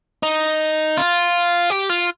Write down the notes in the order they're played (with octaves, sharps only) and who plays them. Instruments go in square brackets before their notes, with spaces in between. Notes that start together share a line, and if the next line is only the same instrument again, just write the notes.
[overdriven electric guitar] D#4
F4
G4
F4